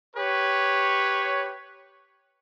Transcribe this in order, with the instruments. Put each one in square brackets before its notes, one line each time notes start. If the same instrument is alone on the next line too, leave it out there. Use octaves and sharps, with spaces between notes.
[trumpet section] G4 B4 C#5